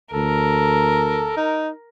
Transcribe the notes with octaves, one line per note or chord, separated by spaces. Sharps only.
D2 A4 A#4
D#4